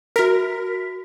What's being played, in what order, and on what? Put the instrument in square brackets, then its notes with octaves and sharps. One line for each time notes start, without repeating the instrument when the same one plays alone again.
[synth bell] F#4 B6 [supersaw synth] A#4